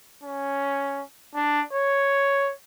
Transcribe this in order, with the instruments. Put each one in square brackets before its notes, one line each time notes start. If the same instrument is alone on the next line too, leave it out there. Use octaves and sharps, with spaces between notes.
[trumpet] C#4
D4
C#5